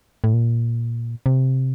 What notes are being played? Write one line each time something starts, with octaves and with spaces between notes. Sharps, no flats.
A2
A#2
C3